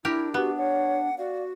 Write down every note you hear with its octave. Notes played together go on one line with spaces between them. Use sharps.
D4 E4 G4 A#4
B3 F#4 G4
C#5 F#5
F#4 D5 F5